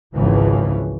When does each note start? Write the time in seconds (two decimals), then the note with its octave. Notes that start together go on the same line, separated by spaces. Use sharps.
0.15 G#1 C#2 C#3 E3 F3